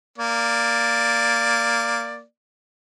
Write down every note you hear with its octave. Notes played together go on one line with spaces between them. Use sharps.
A#3 D5